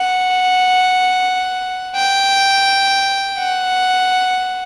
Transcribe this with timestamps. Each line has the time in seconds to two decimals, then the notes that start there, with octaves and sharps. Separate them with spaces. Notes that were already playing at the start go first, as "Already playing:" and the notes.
Already playing: F#5
1.96 G5
3.39 F#5